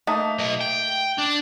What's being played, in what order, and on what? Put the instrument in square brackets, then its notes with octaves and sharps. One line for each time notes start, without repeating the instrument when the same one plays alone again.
[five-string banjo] A3 A#3 D#4
[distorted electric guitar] B1 D#5
G5
D4